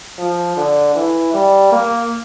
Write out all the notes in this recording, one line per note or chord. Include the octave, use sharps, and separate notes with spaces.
F3
D3
E3
G3
A#3